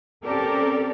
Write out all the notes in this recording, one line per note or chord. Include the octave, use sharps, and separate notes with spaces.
C4 C#4 G4 A4 A#4 D5